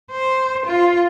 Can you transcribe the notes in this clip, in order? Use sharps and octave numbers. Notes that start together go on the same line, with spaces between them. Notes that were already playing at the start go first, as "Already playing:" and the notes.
C5
F4